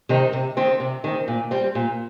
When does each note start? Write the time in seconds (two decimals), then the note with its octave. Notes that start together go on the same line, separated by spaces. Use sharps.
0.09 C3 D#3 C4 D#4
0.33 C3
0.57 D#3 C4
0.80 C3
1.04 D#3 C4
1.28 A#2
1.51 G3 C4
1.75 A#2